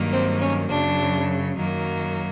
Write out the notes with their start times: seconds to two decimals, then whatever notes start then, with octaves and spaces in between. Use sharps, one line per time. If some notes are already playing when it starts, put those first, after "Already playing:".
Already playing: G2 D#3 F#3 A#3
0.12 C4
0.41 C#4
0.69 F#2 C#3 F#3 D4
1.55 F#2 D#3 F#3 A#3